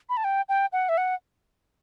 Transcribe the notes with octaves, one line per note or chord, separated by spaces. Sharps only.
B5
A5
G5
G5
F#5
E5
F#5